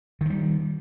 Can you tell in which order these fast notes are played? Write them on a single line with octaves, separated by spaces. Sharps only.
D#3 F3 G3